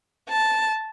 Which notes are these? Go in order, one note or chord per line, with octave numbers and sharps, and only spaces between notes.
A5